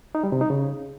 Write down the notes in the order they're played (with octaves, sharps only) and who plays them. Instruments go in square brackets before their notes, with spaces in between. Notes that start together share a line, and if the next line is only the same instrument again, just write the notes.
[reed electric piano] D#4
G3
C3
D#4
C#3